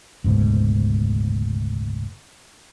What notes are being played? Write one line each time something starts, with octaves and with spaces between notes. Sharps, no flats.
F#1 D2 G#2 B2